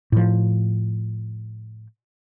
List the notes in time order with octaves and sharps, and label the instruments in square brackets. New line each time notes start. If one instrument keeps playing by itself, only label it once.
[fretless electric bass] A2 F3